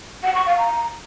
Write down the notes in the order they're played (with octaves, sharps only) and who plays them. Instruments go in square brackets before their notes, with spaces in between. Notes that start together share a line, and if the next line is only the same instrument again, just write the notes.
[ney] F#5
C#6
F5
A#5